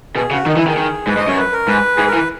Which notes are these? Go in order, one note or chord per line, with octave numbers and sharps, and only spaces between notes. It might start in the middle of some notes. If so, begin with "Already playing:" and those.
B2 G#4
C#3 F#4
D#3 D#4
E3 E4
D#3 G#4
D#3
G#2 B4
G#2 D#5
F#2 C#5
B4
A#4
G#2 B4
G#2 G#4
A#4
E3
B4